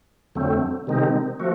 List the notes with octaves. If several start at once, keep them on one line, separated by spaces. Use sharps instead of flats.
F2 D3 F#3 A3 C4
C3 D#3 G#3 C4 D#4
F3 A3 F#4